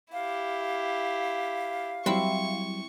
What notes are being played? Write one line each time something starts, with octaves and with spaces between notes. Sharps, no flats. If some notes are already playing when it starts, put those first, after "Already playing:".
E4 G4 F5
F#3 G3 C4 E4 C#6